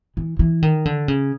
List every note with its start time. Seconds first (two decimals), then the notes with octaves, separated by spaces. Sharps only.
0.17 E3
0.39 E3
0.62 D#3
0.85 D3
1.08 C#3